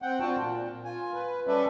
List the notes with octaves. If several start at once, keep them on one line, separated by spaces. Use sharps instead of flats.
C4 F#5 G5
C4 D4 F4 F#4 G5 A5
A#2
F4 G#5
B4
G3 C#4 A4 B4 D5 E5